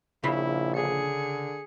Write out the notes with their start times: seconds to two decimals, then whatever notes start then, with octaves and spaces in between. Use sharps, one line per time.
0.24 A#1 C#3 E4 B5
0.75 D3 G#4 C#7